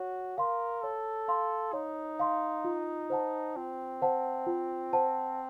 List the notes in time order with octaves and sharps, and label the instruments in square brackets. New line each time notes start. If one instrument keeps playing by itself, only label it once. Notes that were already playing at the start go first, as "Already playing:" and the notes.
Already playing: [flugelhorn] F#4 [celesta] C#5
[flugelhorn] A#4 [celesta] F5 C6
[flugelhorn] A4 [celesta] C#5
[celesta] F5 C6
[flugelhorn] D#4 [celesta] C#5
[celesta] F5 C6
F4
C5 F#5 A5
[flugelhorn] C4 [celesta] F4
[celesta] C5 F#5 A5
F4
C5 F#5 A5